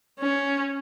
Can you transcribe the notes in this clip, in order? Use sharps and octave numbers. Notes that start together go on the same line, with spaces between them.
C#4